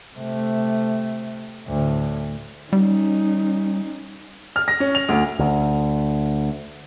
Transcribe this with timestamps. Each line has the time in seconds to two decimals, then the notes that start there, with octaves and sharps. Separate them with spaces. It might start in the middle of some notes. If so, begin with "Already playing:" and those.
0.14 C3 A3
1.67 D2 A2
2.73 G3 C#4 D#4
4.56 F6
4.68 A#6
4.80 C#4
4.95 F7
5.09 D2
5.39 D2